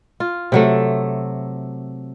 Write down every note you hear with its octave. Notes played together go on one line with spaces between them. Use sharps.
F4
C3 F#3 A3